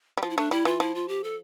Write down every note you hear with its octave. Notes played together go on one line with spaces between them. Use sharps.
G3
F3 F4
E4
A3 D4
G3 E4
E3 F4
F3 E4
F4
G4
A4